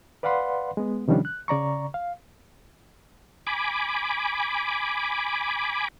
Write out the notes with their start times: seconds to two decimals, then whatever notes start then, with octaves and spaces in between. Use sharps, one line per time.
0.23 B4 D5 F5 F#5 B5 C6
0.77 G#3 B3
1.08 C3 D#3 F3 G3 C#4 D4
1.25 F#6
1.48 C#3 D5 A#5 C#6
1.94 F5
3.47 G#5 B5 D6